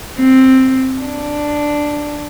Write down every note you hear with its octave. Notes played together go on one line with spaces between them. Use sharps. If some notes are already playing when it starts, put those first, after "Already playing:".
C4
D4